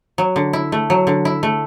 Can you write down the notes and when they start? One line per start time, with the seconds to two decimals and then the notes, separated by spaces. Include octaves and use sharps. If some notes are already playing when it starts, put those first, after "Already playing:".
0.18 F#3
0.36 D3
0.53 E4
0.72 A3
0.90 F#3
1.07 D3
1.25 E4
1.43 A3